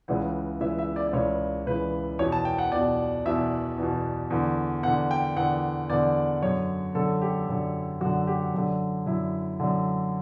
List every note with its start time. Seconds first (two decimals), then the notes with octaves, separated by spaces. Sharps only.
0.08 C#2 C#3 E3 F#5
0.60 C#2 C#3 E3 E5
0.78 E5
0.96 D5
1.07 D5
1.13 C#2 C#3 E3 C#5
1.66 C#2 C#3 E3 B4
2.19 E2 B2 C#5
2.32 A5
2.45 G5
2.58 F#5
2.72 E2 B2 D5
3.25 E2 B2 E5
3.78 E2 B2
4.30 E2 D3
4.83 E2 F#5
4.87 D3
5.11 G5
5.36 E2 D3 F#5
5.89 E2 D3 D5
6.42 F#2 D3 C#5
6.95 F#2 D3 A4
7.22 G4
7.49 F#2 D3
8.01 F#2 F#4
8.05 D3
8.27 G4
8.54 F#2 D3
9.06 F#2 D3 E4
9.60 F#2 D3